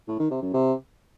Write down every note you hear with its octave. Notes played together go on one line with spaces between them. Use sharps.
A2
D#3
C3
F#2
C3